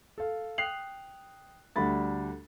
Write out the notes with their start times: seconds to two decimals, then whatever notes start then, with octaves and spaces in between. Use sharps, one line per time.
0.18 A4 F5
0.58 G5 D#6 F#6 C7 F7 F#7
1.76 D2 G3 A3 D4 B5 A6